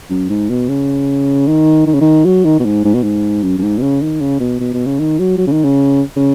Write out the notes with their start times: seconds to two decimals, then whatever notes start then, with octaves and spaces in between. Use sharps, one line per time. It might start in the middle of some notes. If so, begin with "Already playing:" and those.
0.10 F#2
0.29 G#2
0.50 B2
0.69 C#3
1.48 D#3
1.86 D#3
1.94 C#3
2.01 D#3
2.25 F#3
2.45 D#3
2.59 B2
2.65 G#2
2.85 G#2
2.94 B2
3.03 G#2
3.43 F#2
3.58 F#2
3.63 G#2
3.78 B2
3.82 C#3
4.02 D#3
4.21 C#3
4.40 B2
4.60 B2
4.73 B2
4.86 C#3
4.99 D#3
5.19 F#3
5.38 F#3
5.47 C#3
5.52 D#3
5.64 C#3
6.17 C#3